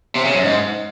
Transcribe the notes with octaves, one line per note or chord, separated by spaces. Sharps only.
C3
C#3
F#2
G#2